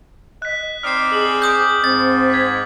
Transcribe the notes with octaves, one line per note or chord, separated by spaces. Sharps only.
D#5 F#6 B6
C4 D#4 D5 F6 C7
G#4 F#7
D6 D#6 G6
G#2 C4 A6
G#6 B6